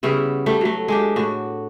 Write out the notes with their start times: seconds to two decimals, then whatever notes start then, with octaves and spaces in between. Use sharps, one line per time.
0.03 C#3 G3 B3 E4
0.46 G3 A3
0.61 F#3 A3
0.88 G#3 D4 G4
1.16 A2 F#4